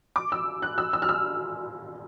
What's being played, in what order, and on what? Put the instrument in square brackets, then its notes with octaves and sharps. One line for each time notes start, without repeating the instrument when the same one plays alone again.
[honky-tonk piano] D6
E6
F#6
E6
E6
F6
E6